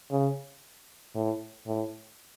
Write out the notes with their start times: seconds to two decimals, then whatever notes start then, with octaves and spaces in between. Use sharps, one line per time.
0.11 C#3
1.15 A2
1.67 A2